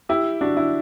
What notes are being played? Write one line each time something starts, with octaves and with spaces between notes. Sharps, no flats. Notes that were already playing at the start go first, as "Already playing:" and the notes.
E4 G4
D4 F#4
E4